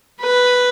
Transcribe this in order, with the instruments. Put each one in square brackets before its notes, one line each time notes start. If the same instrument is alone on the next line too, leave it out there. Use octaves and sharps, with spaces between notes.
[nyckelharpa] B4